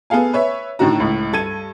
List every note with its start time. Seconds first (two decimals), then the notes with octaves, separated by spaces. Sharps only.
0.10 B3 G#4 A4 F5 G#5
0.33 B4 C#5 E5
0.79 A2 D3 D#3 F#4 A#5
1.00 C#2 A2
1.32 G2 A4 G#6 D#7